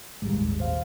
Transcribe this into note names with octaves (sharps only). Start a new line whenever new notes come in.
G#1 D#2 A#2 G3 G#3
C5 F5